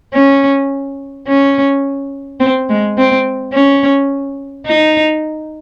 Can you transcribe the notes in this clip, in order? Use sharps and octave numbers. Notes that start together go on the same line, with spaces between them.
C#4
C#4
C4
G#3
C4
C#4
D#4